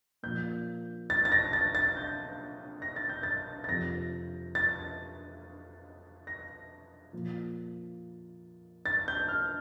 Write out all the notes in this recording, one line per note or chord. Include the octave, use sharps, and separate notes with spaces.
A#2 F3 G6
A6
A6
A#6
A6
A6
G6
A#6
A6
G6
A6
A6
F2 C3 F3 A#6
A6
A#6
A#2 F3
A6
G6
F6